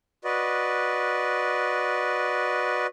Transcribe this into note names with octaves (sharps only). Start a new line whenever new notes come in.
F#4 B4 D5 D#5